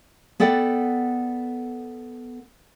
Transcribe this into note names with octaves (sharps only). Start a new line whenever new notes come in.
B3 A4 D5 F#5 G5